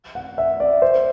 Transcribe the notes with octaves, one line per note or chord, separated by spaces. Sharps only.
F#5
E5
D5
C5